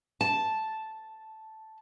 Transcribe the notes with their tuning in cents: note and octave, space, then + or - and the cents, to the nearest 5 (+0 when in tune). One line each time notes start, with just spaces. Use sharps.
A5 -5